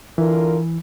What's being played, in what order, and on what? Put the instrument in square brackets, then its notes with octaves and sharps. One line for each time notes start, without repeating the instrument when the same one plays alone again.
[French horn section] D3 F4 A#4 [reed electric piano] E3